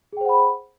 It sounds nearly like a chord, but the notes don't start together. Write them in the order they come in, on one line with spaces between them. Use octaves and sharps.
G#4 G5 C5 F#5 B5